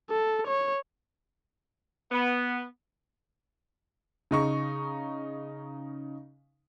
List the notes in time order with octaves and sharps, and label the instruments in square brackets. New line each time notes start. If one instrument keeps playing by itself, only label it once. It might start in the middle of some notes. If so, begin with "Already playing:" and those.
[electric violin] A4
C#5
[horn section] B3
[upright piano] C#3 D#4 C#6